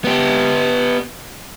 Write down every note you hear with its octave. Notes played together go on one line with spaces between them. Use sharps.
B3 G4